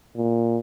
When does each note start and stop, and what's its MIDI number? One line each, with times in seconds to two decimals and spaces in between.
0.16 0.58 46